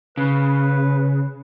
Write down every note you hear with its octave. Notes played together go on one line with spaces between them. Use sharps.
C#3 B4